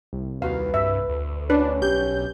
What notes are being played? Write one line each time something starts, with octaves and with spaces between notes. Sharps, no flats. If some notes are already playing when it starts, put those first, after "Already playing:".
C2
D#2 F#4 B4 F5
G2 E5
D2
C#4 D4 B4
B1 G4 G6